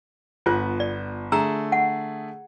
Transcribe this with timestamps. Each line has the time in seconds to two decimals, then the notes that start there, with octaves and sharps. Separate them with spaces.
0.46 G1 B3 F4 F#6
0.80 D5
1.32 D3 A3 G#4 A#5 E6
1.72 F#5